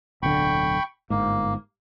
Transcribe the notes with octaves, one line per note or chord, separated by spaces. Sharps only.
D1 B1 D3 G5 B5 C#6
G1 G#2 A#3